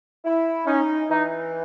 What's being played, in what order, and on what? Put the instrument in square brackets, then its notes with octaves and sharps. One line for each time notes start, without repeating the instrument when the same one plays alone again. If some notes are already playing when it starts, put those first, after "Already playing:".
[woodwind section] E4
[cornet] C#4 [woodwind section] D#4
[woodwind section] E3 [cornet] D#4